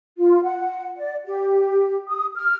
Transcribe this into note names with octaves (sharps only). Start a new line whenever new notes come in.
F4
F#5
D5
G4
D#6
F6